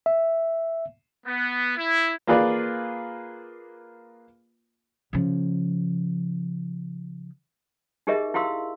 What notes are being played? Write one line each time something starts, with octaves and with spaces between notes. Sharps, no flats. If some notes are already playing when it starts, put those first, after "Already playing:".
E5
B3
E4
A#3 F4 G#4 B4 D5
C#3 F3
D#4 G4 G#4 A#4 D#5 E5
E4 G4 F5 C6 E6